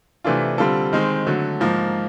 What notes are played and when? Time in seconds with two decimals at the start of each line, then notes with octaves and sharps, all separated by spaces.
0.24 C3 E3 A3 D4 F4
0.58 D3 G3 C4 F4 A4
0.93 D#3 G#3 C4
1.27 D3 F#3 A3
1.60 G#2 F3 A#3